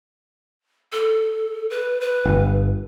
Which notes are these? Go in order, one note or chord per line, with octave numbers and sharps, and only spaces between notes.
A4
B4
B4
G1